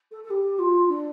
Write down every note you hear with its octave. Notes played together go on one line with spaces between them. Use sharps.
A4
A4
G4
F4
D4